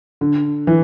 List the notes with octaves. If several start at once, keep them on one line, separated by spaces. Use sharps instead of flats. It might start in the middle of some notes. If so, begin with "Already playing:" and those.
D3
E3